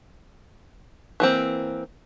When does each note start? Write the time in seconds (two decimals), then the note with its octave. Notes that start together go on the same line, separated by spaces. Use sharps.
1.20 E3 A#3 C4